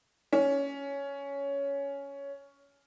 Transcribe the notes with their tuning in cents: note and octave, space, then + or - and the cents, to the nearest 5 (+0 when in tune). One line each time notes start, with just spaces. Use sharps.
C#4 +10